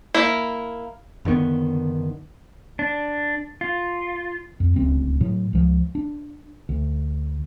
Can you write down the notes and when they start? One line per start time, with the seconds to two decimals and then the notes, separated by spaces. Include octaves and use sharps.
0.14 A#3 E4
1.25 F#1 D3 D#3 B3
2.79 D4
3.61 F4
4.60 F2
4.76 D1 C#2 C4
5.20 A2 F#3
5.53 C#2 F3
5.95 D4
6.69 D2